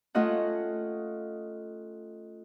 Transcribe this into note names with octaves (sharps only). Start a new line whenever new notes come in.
A3 C#4 F4 D#5 F#5